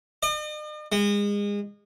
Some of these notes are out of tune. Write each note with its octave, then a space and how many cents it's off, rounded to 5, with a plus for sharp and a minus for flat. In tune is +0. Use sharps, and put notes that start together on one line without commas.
D#5 -45
G#3 -30